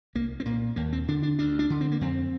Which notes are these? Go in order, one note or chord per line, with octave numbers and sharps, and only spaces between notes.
C2 A#3
C4
A#2 A#3
D#2 A#3
C4
D3 D4
D4
D2 D4
D4
D3
C4
A#3
F2 C4